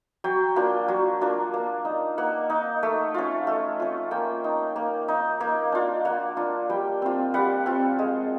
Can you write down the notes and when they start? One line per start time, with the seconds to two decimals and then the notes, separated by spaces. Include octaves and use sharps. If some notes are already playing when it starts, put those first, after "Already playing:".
0.24 F#3 G5
0.56 A#3 D4 F4
0.88 F#3
1.21 A#3 D4 F4
1.54 A#3
1.85 D#4
2.18 A#3 F#5
2.50 D#4
2.83 A3
3.14 C#4 F4
3.47 A3
3.80 C#4 F4
4.11 A#3 G5
4.44 D#4
4.76 A#3
5.08 D#4
5.40 A#3
5.72 D4 F4
6.05 A#3 F#5
6.37 D4 F4
6.70 G3 G5
7.02 C4 F4
7.34 G3 F#5
7.66 C4 F4
7.99 G#3